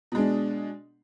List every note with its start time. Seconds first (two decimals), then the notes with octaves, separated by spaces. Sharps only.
0.12 B2
0.15 G#3
0.18 D4